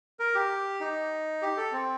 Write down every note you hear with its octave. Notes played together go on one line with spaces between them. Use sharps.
A#4
G4
D#4
G4
A4
C4